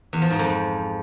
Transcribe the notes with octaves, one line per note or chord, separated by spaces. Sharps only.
E2
F3
G#2
F2